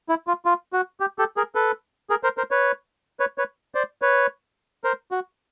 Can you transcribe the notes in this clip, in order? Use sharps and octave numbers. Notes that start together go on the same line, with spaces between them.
E4
F4
F4
F#4
G4
G4 A4
G#4 A#4
A4 B4
G#4 A#4
A#4 C5
A#4 C5
B4 C#5
B4 C#5
B4 C#5
C5 D5
B4 C#5
A#4 C5
F#4